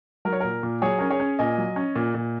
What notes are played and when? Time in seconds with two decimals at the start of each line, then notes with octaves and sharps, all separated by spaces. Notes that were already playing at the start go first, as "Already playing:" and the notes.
0.25 F#3 A#4
0.33 C#5
0.40 A#2 A#4
0.63 A#2
0.82 F#3 G#4 C#5
0.98 C#4 A#4
1.10 G#4 C#5
1.20 C#4
1.39 A#2 D#5 G#5
1.58 F#3
1.76 C#4
1.96 A#2
2.14 A#2